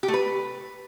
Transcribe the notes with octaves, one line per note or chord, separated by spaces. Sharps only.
G4
A3
B4